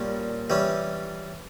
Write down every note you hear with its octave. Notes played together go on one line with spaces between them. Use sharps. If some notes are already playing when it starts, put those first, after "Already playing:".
Already playing: A#2 G3 C#4
E3 G3 C#4